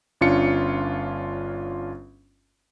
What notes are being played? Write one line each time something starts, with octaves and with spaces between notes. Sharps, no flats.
G1 C#4 D4 F4 C#7